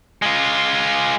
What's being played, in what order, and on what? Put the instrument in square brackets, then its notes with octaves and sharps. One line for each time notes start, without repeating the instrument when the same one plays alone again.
[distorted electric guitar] G#3 F4